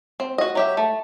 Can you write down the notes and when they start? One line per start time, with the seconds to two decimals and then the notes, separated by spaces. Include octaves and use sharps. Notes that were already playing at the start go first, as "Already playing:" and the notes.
0.20 C4
0.38 F#4 D#5
0.55 F#3 G4 E5
0.77 A3